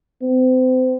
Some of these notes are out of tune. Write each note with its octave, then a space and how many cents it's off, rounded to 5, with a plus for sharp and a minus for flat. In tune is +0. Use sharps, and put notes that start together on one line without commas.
C4 -35